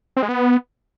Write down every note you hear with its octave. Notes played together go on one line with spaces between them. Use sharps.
C4
G#3
B3